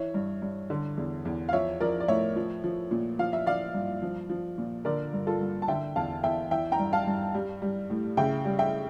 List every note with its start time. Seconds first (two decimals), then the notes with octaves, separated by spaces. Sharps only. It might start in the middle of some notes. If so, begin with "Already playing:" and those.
Already playing: E3 C#5 E5
0.14 G2
0.42 G2
0.70 D3
0.97 E2
1.25 E2
1.49 F5
1.53 F3 C#5 E5
1.80 F3 A#4 D5
2.00 D5
2.08 A2 C#5 E5
2.36 F3
2.64 F3
2.91 A#2
3.19 F3 F5
3.33 E5
3.46 F3 D5 F5
3.74 G2
4.02 F3
4.30 F3
4.58 A#2
4.85 D3 A#4 D5
5.13 G2
5.27 F4 A4
5.41 G2
5.62 A5
5.68 D3 E5 G5
5.96 E2 F5 A5
6.23 E2 E5 G5
6.51 E3 E5 G5
6.72 G5 A#5
6.79 G2
6.93 F5 A5
7.07 G2
7.35 G3
7.62 G3
7.90 A2
8.17 C#3 E5 G5
8.45 G3
8.59 E5 G5